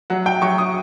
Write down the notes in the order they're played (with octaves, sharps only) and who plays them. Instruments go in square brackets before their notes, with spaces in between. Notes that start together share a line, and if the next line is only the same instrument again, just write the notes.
[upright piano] F#3 F#5
G5
F#3 C#6
D#6